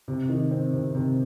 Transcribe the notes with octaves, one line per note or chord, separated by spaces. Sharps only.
C3
D#3
C4
C3
C3